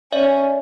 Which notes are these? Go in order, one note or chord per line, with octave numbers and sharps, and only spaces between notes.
C#4 D5 E5